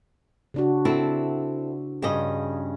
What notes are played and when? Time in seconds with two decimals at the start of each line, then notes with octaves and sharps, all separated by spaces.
0.54 C#3 D4 F#4
0.85 C4 E4 A4
2.02 G2 C#3 G#4 D#5